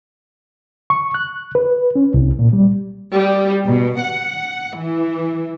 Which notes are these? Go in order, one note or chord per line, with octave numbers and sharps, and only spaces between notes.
C#6
F#6
B4
C#4
C2
A#2
G3
G3
B2
F#5
E3